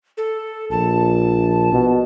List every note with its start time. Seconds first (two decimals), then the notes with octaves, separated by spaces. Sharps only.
0.17 A4
0.71 A#1 A5
1.73 B2